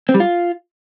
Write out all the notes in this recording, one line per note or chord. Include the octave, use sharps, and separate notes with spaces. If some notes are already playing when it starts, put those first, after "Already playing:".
C4
G3
F4